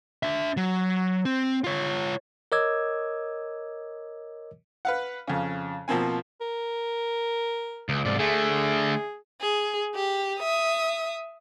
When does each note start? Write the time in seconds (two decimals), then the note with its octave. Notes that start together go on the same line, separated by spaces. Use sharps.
0.23 D4 E5
0.57 F#3
1.25 C4
1.64 F4 C#5
2.52 A#4 C#5 D#5 D6 E6 G#6
4.85 B4 F5 F#5
5.28 F2 C#3
5.88 B2 F3 A#3 C4 G#5
6.41 A#4
7.89 C#2
8.05 C2 G#2 D5
8.19 D3 A3 G#4
9.41 G#4
9.95 G4
10.40 E5 D#6